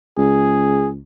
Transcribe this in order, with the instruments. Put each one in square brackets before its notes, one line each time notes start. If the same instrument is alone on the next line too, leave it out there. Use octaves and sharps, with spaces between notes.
[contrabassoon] C#2 [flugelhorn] G#4